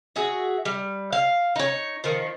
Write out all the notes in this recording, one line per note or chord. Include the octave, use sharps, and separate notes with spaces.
F#4 G#4 E5
G3
F5
D#4 C#5
D#3 F3